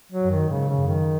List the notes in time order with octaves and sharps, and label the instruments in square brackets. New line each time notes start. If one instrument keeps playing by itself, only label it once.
[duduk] F#3
[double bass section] F#2
[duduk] D#3
[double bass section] G#2 [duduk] C#3
[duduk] C#3
[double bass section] F#2
[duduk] D#3